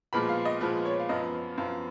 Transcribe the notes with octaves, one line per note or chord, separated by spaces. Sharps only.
A#2 F3 G#3 B3 B5
F5
D#5
A#2 F3 G#3 B3 B4
C#5
F5
F#2 F3 B3 D#5
F#2 F3 B3 F5